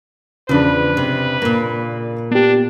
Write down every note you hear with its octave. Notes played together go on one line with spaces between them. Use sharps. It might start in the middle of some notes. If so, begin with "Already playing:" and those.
E2 C#3 F3 D4 B4
C3
A#2 A#3
B3 D4 G4